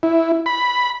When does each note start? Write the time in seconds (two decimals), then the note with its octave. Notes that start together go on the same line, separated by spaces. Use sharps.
0.03 E4
0.46 B5